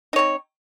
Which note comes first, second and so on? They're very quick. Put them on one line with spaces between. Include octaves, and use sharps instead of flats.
D#4 C#5 C4